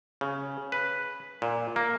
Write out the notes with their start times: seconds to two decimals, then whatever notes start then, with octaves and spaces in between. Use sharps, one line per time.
0.21 C#3
0.72 B4
1.42 A#2
1.76 A#3